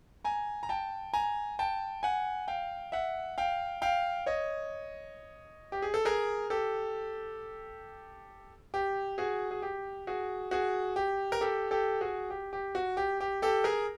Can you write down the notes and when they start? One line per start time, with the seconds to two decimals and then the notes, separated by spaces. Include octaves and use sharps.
0.24 G#5 A#5
0.63 A#5
0.69 G5 A5
1.13 G#5 A#5
1.59 G5 A5
2.03 F#5 G#5
2.48 F5 G5
2.92 E5 F#5
3.38 F5 G5
3.82 F5 G5
4.26 C#5 D#5
5.72 G4
5.82 G#4
5.94 A4
6.05 G#4 A#4
6.50 G4 A4
8.74 G4
9.18 F#4 G#4
9.51 G#4
9.62 G4
10.07 F#4 G#4
10.51 F#4 G#4
10.96 G4
11.32 A#4
11.41 G4 A4
11.71 G4 A4
12.01 F#4 G#4
12.30 G4
12.53 G4
12.75 F#4
12.97 G4
13.20 G4
13.42 G4 A4
13.64 G#4 A#4